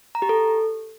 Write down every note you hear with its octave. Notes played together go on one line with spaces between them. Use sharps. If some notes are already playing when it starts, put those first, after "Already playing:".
A#5
G4
A4